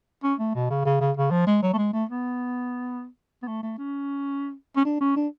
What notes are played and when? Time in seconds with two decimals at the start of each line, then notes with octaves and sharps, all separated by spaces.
0.23 C#4
0.40 A3
0.55 B2
0.70 C#3
0.85 C#3
1.01 C#3
1.17 C#3
1.31 F3
1.47 G#3
1.63 F#3
1.74 A3
1.78 G#3
1.93 A3
2.09 B3
3.43 B3
3.48 A3
3.63 A3
3.78 C#4
4.77 C#4
4.85 D4
5.01 C#4
5.16 D4